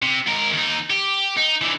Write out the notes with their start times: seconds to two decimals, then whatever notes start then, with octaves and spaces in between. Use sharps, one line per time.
0.03 C3
0.28 G#2 A#4
0.53 D#2 D#4
0.90 G4
1.37 D#4
1.61 D3 E3